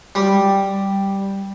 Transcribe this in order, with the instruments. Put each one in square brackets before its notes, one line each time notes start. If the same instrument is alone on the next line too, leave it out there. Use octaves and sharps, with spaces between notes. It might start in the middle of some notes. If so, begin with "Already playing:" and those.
[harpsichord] G3